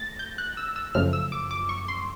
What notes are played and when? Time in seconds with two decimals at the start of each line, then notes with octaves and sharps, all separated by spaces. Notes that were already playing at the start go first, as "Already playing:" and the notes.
Already playing: A3 A6 A#6
0.19 G6
0.38 F#6
0.57 E6
0.76 E6
0.95 F#2 C#3 F3 A3 F6
1.13 E6
1.32 D6
1.51 D6
1.69 C#6
1.88 C6